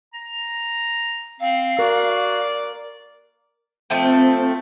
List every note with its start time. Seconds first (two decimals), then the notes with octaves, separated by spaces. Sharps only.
0.14 A#5
1.40 C4 F5
1.79 F#4 A#4 D5
3.90 F3 A3 C4 G5